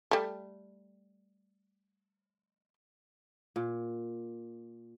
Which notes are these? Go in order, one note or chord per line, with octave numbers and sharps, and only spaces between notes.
G3 A3
A#2